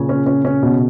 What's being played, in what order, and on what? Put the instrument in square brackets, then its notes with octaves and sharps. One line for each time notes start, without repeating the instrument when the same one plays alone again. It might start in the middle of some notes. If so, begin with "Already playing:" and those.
Already playing: [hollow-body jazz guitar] A#2 C#3
[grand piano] C#4
C#4
C#4
B2